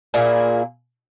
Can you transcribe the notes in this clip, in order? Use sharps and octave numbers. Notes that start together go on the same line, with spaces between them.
A#2 A#3 E4 G#4